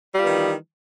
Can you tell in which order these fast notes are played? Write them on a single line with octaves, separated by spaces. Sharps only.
G3 F4 B3 D#3 E3